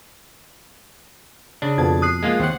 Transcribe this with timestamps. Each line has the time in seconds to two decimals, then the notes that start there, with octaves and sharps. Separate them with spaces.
1.62 C#3 D4
1.78 F2 B2 A5 G#6
2.02 D#6 F#6 C7
2.23 G#3 A#3 F4
2.40 D#2 C4 F#5